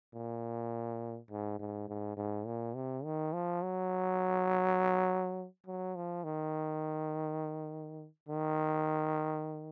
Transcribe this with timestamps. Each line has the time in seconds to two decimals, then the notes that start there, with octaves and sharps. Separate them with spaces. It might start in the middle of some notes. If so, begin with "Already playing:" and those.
0.14 A#2
1.30 G#2
1.59 G#2
1.88 G#2
2.17 G#2
2.46 A#2
2.75 C3
3.04 D#3
3.33 F3
3.62 F#3
5.66 F#3
5.96 F3
6.24 D#3
8.28 D#3